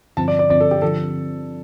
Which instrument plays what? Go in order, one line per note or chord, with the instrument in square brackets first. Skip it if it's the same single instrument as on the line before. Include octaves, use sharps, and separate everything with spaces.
[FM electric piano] G2 D3 F3 C4 [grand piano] A5
[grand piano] D5
D5
[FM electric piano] G2 D3 F3 C4 [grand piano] D5
[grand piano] A4
G4
[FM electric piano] D3 F3 [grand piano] A4